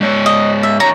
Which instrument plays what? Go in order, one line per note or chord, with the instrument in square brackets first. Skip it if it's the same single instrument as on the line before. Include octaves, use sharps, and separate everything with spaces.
[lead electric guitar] G#2 C#5
[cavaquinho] D#5
E5
[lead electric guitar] F2 C#5 [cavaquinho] A#5